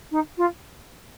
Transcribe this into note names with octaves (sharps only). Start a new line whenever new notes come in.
D#4
F4